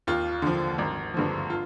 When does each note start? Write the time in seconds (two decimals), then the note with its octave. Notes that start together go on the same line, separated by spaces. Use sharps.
0.07 D#2 F4
0.42 D3 F3
0.78 G#1
1.14 G2 D3 F3
1.50 F4